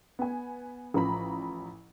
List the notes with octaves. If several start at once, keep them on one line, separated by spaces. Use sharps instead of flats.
B3 G#5
A1 F3 A#5 B5